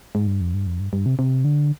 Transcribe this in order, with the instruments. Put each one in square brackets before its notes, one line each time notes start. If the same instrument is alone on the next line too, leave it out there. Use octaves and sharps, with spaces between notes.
[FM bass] G#2
G2
F2
G2
F2
G2
G2
C3
C3
D3